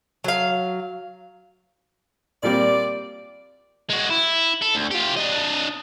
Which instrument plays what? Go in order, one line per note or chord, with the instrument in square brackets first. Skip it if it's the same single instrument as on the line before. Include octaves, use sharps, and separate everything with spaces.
[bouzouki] F#3 F5
[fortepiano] A#2 G3 C4 [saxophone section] D5
[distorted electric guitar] G#3 F#4
E4
A4
D2
F4 G4
D4 D#5